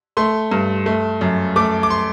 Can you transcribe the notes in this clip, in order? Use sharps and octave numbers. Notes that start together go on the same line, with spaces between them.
A3 C6
G2
A3
F#2
A3 D6
D6
C6